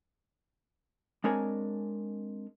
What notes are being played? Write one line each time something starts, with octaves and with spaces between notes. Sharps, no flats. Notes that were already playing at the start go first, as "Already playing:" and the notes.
G#3 C4 D4 A#4 C#5 G#5